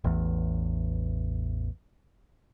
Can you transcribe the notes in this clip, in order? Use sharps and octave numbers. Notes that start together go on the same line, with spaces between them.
A1 E2